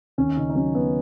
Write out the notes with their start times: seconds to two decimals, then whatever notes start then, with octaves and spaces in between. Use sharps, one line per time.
0.18 D#2 C#4
0.37 C#3 D#4
0.50 D#4
0.55 F#3 C#4
0.75 F#3 B3